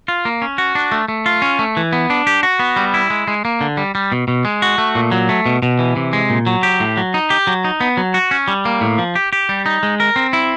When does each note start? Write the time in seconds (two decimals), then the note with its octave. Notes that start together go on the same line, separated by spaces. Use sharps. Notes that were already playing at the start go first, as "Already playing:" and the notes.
0.08 F4
0.25 A#3
0.42 C#4
0.58 F#4
0.75 D4
0.92 A3
1.08 A3
1.26 F4
1.42 C#4
1.59 A3
1.77 E3
1.93 B3
2.10 D4
2.27 G4
2.43 F#4
2.59 B3
2.76 G3
2.94 E4
3.10 G#3
3.28 G#3
3.45 A#3
3.61 D3
3.77 G3
3.95 G3
4.12 B2
4.28 B2
4.45 G#3
4.62 F#4
4.78 A3
4.95 A#2
5.12 F#3
5.29 A3
5.46 B2
5.63 B2
5.79 E3
5.96 C3
6.13 G#3
6.30 A#2
6.47 F#3
6.63 G4
6.80 A2
6.97 F#3
7.14 D#4
7.30 G4
7.47 F#3
7.64 D#4
7.80 B3
7.97 F#3
8.14 F#4
8.31 C#4
8.48 G3
8.65 A#3
8.81 A2
8.98 F3
9.16 G4
9.33 G4
9.49 G3
9.66 D#4
9.83 G#3
10.00 A#4
10.16 C4
10.33 E4